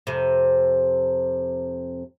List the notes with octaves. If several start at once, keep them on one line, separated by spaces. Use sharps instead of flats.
F2 C3